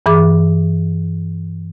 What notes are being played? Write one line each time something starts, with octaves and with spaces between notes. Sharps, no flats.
G2 E3 G#4 D6